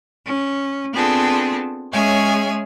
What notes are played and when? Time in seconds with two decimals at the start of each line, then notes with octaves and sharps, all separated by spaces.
0.25 C#4
0.92 B3 C4 D4 F4 G#4 A4
1.93 G#3 C#4 G#4 C#5 E5 G#5